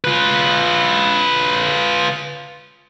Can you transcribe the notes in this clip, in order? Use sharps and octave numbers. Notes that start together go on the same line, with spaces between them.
F4 B4